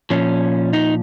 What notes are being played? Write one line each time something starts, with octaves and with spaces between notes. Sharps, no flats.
A#2 F3 C#4
D#4